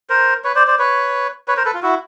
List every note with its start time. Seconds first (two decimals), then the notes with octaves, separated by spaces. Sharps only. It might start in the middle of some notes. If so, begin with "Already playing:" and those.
0.10 A#4 C5
0.44 B4 C#5
0.56 C5 D5
0.67 C5 D5
0.79 B4 C#5
1.48 B4 C#5
1.57 A#4 C5
1.65 A4 B4
1.74 F4
1.82 E4 F#4